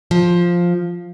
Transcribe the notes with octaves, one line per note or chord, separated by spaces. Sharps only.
F3